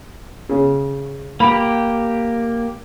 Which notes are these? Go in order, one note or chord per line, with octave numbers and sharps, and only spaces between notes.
C#3
A#3 G4 B5